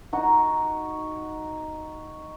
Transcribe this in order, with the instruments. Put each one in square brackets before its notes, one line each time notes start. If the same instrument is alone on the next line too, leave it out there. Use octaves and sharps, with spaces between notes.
[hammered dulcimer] D#4 F#4